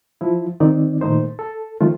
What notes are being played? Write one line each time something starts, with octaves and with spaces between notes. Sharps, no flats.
F3 E4
D#3 C4 D#4 D5
A#2 D#3 A3 D#4 C5
A4
D#3 F3 A3 F4